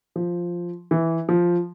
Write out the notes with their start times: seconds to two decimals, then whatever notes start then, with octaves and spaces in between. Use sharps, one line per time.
0.16 F3
0.91 E3
1.29 F3